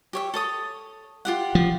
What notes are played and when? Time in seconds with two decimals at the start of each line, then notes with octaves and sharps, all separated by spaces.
0.13 G4 C#5 E5
0.34 A4 C#5 D#6
1.25 F4 G4 F#5
1.55 F3